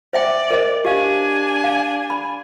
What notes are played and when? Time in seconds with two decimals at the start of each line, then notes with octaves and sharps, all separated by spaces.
0.13 C5 D5 E5 G5
0.51 A#4 C5 D#5
0.85 D4 G4 F5 G#5
1.64 F5
2.10 B5